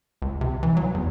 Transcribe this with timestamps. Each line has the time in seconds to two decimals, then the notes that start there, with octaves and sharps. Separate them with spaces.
0.22 C#2
0.41 C3
0.63 E3
0.77 F#3
0.94 E2